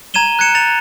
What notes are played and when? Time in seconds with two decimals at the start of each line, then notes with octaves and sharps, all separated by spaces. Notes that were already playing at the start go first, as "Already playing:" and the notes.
0.14 A#5 G#6 D#7 E7 G7
0.39 F#6 G#6 C#7 E7
0.55 A6 C#7 F7